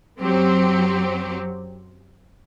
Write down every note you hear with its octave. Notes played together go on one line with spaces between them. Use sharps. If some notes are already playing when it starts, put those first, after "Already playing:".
F#2 F#3 C4 G4